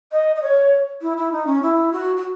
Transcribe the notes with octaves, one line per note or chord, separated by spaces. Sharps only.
D#5
D#5
C#5
E4
E4
D#4
C#4
E4
F#4
F#4